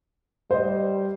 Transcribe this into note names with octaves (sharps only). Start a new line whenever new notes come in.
G3 C5 D#5